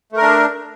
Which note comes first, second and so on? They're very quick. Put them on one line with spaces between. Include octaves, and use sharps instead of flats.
A3 A#4 D4